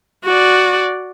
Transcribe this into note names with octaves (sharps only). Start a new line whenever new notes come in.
F#4 D5